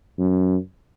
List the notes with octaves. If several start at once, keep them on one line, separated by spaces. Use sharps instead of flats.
F#2